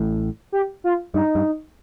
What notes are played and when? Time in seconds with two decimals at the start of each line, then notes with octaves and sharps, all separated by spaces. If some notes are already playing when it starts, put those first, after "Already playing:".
Already playing: A1 A2
0.52 G4
0.84 F4
1.14 G2 D#4
1.35 G2